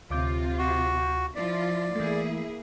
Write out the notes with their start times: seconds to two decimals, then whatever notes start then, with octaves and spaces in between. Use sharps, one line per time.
0.11 D2 C3 F4 D6 G6
0.58 F#4
1.36 F3 E4 F4 D5
1.95 E3 A3 A#3 E4 G#4